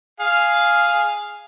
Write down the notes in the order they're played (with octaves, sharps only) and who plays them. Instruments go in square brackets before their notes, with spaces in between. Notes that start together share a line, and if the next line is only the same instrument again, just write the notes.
[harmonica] G#4 F5